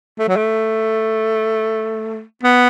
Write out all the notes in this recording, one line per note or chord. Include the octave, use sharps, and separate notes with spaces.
A3
F#3
A3
B3